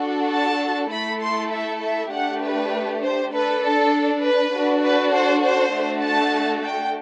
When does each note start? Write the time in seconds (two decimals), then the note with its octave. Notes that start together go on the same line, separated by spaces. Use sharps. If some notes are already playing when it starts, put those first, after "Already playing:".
Already playing: D4 F#4 A4
0.31 A5
0.91 A3 E4 A4 B5
1.21 C6
1.51 E5
1.83 E5
2.12 A3 D4 G4 F#5
2.43 B4
3.03 C5
3.33 D4 A4 B4
3.63 A4
4.23 B4
4.54 D4 F#4 A4
4.83 B4
5.14 C5
5.44 C5
5.74 A3 D4 F#4 A4
6.04 A5
6.64 G5